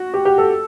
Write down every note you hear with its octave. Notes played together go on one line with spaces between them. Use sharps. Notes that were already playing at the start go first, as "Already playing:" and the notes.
Already playing: F#4
G4
G4
A4